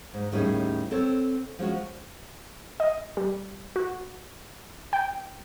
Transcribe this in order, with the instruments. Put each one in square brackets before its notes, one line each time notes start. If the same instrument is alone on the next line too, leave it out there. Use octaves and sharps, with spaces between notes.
[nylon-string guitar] G#2
D#2 A2 G3 C#4 D#4 G#4
C4 A4 C#5
F3 G#3 C#4 F#4
[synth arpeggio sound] D#5
G3
F#4
G5